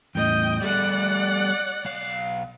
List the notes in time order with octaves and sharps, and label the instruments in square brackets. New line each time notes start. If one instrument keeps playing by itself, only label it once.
[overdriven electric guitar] E2 A2 [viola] D#5 G5
[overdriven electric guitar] G3 A3 [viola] D5 F#5
[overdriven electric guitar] B1 F5